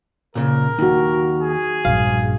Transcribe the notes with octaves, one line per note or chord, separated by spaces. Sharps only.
A#2 C#3 A#4
D#2 D#4 F#4
G#4
A#1 G2 F5